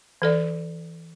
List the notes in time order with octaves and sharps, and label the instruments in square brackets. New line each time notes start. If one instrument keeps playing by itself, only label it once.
[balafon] E3 A4 D5